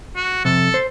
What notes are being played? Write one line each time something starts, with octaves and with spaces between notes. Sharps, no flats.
F#4
F2 C3 A4
C5